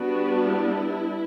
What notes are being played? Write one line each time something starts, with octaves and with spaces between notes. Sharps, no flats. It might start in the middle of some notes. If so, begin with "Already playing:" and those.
Already playing: G3 B3 D4 F#4
E4